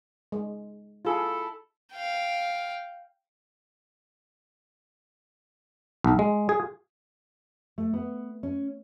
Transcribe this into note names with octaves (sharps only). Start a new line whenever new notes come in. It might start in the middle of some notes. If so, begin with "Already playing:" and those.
G#3
E4 F4 G#4 A4
F5 G5
B1
G#3
G#4
A3
B3
C#4